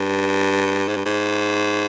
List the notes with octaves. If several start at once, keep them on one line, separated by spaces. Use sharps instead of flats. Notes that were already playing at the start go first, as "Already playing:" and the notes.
Already playing: G2
G#2
G2
G#2